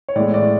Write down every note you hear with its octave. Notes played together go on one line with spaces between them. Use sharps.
C#5
A2 E3 G#3 D5
D5